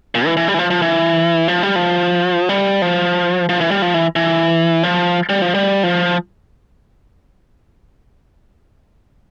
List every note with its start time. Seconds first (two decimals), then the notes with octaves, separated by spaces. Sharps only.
0.15 A#2
0.26 E3
0.37 E3
0.48 G3
0.54 E3
0.59 F3
0.70 F3
0.82 E3
1.48 F3
1.63 G3
1.76 F3
2.49 G3
2.82 F3
3.49 F3
3.61 E3
3.71 G3
3.82 F3
3.94 E3
4.16 E3
4.83 F3
5.29 G3
5.42 F3
5.55 G3
5.83 F3